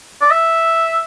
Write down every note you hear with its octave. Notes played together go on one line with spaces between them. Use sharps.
D5
E5